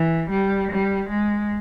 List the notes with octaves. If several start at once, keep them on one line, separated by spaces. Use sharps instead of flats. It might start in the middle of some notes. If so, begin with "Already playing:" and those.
Already playing: E3
G3
G3
G#3